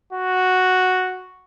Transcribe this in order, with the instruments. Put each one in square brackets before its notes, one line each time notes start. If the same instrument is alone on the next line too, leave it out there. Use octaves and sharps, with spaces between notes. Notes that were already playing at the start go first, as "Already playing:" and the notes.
[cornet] F#4